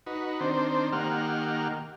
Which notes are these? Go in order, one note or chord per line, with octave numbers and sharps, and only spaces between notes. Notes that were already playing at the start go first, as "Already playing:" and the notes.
D#4 F#4 B4
D#3 C4 D4 C5
D#3 A#3 G4 F#5 F6